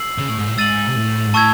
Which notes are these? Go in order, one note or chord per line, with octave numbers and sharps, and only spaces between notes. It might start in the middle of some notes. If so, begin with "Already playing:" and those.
Already playing: E6 C7 F#7
C#3
A2
G#2
A2
G#2 E6 A6 D#7 F#7
C3
A2
G#2
A2 A5 C#6 E6 G#6